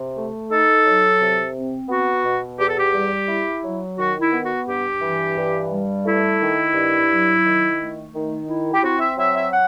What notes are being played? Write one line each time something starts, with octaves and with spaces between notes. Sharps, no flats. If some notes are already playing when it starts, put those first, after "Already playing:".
Already playing: C3
A3
D#4 A4
F#3
C3
C4
B3 F#4
B2
E2 G4
A4
G4
G3
E4
F#3
D#3 F#4
E4
B3
F#4
G2 G4
E3
G2
G3
A3 E4
D#3
G2
F#3
D#3
A3
D#3
E4
G4
C4 F#4
E5
F#3 E5
E5
F#5